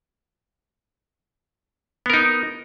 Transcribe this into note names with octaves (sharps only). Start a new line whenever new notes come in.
B3 D#4 A#4